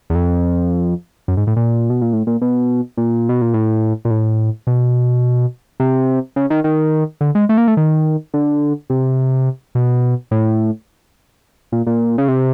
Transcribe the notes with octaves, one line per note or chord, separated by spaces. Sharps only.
E2
F2
F#2
G#2
A2
A#2
B2
A#2
A2
A#2
B2
A#2
B2
A#2
A2
A#2
A2
B2
C3
C#3
D#3
D#3
D3
G#3
A3
A#3
A3
D#3
D3
C3
B2
A2
A#2
A#2
C#3
C3